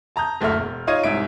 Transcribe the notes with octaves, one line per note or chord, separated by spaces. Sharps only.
A5 A#5 D#6 G6
F#1 D2 A3 E5 F6
E1
D#4 F4 C#5 D#5 G#6 D#7
C2 G#2 E5 D7